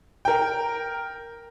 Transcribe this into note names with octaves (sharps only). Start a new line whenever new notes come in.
A#4 G5